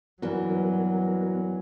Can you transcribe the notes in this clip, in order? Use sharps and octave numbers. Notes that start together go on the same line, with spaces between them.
G2 E3 F#3 B3 F#4 A#4